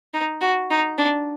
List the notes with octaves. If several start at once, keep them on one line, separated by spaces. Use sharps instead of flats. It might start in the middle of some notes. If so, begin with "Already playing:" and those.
D#4
F#4
D#4
D4